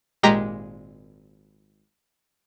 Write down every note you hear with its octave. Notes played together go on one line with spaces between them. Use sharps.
G#1 A#2 G#3 G4 A#5 B6